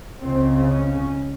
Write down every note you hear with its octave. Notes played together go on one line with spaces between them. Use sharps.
C#2 C#3 C4
C#4